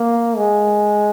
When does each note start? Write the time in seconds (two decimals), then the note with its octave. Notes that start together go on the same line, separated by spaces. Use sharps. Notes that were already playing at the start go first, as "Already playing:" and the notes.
Already playing: A#3
0.36 G#3